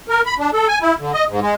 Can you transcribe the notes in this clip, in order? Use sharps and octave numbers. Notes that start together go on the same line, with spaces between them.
A#4
B5
D4
A4
G#5
E4
D3
D#5
G#2
G#3